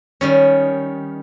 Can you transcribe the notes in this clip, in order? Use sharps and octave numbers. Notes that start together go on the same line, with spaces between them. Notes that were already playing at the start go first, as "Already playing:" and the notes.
D#3 G3 C#4